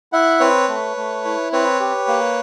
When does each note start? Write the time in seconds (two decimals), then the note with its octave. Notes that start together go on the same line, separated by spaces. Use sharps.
0.12 E4 E5 F#5
0.40 C4 B4 C#5
0.68 A3
0.97 A3
1.25 E4
1.52 C4 B4 C#5
1.80 G4
2.08 A#3